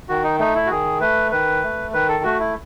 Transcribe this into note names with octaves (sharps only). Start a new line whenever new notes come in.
D#3 F#4
D#4
A3 D#4
E4
F#4
D#3 G#4
A3 B4
D#3 B4
A3
D#3 B4
A4
A3 F#4
E4